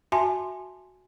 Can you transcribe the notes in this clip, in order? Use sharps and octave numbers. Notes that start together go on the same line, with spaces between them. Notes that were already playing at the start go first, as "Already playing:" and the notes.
F#4 E5 G#5 A5 C6